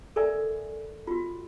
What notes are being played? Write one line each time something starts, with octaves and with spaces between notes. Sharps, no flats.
A4 A#4 D5 E5 G#5
F4 F#4